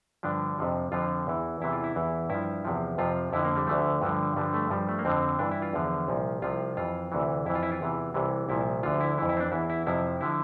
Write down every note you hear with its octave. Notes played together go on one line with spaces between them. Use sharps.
G2 D3 F3 D4
F2 C3 F3
F2 D3 F3 F4
E2 E3
E2 C3 E3 E4
F4
E4
E2 E3
G2 F3 E4
E2 C3 F3
F2 C3 F3 F4
F2 D3 F3 E4
A#3
G3
D2 D3 F3 A3
G2 D3 F3
G2 D3 F3 G3
A3
G2 F3 G3
A3
A#3
F2 D3 F3 C4
G2 E3 D4
E4
F4
E2 D3 F3
C2 A#2 F3
C2 C3 F3 F4
F2 E3 F4
D2 C3 E3
F2 E3 E4
F4
E4
F4
E2 C3 E3
C2 C3 E3
C2 A#2 F3 E4
D2 D3 F3 F4
E4
F2 E3 E4
E4
C4
D4
E2 E3 E4
E4
F2 C3 F3 E4
D3 F3 E4